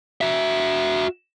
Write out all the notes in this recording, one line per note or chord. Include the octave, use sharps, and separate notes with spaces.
F#4 E5